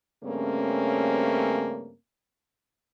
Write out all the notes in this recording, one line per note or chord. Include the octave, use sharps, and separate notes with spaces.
G2 C#3 A3 A#3 C4 C#4